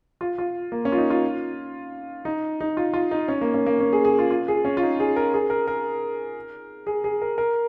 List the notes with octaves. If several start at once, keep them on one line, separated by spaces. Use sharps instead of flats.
F4
F4
A#3
C#4
F4
D#4
F4
D#4
D#4
F4
F4
D#4
C#4
A#3
C#4
A#3
C#4
G#4
G#4
F4
F4
G#4
C#4
F4
D#4
G#4
A#4
G#4
A#4
A#4
G#4
G#4
A#4
A#4